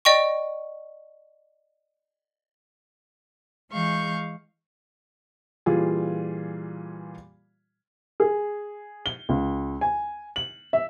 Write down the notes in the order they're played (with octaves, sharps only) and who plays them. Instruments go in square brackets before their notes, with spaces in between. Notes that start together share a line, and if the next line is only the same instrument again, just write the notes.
[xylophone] D5 D#5 G5 C#6
[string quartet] E3 G#3 F5 C#6 G6
[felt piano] A#2 E3 G3 F4 G#4
[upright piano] G#4
G7
C#2
G#5
F#7
E5